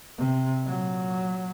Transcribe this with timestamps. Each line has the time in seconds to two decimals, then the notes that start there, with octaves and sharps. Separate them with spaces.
0.18 C3
0.65 A#2 F#3